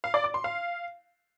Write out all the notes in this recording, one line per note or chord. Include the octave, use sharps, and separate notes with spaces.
F5
D5
D6
C6
F5